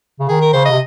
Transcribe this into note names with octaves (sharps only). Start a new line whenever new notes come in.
C#3
D#3 G#4
A#4
C#3 C5
D#5
C3